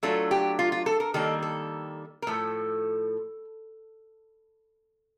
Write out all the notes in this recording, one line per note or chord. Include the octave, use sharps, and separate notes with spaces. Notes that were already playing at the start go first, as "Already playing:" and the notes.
F#3 A3 D4 F4 A4
G4
F4
F4
A4
A#4
D#3 G3 A#3 A4
A4
A#4
A2 F3 A3 A4